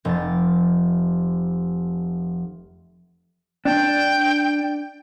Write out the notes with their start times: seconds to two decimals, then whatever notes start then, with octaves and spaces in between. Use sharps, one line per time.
0.05 F1 A6
3.65 D4 G5